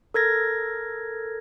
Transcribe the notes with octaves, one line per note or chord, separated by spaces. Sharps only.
A4 A#4 G#6 A#6